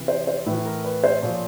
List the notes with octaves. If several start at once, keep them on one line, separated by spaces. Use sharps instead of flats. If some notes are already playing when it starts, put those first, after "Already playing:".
Already playing: C3 E3
C5
C5
A2 E3 B4
A#4
B4
C5
A#2 F3 C#5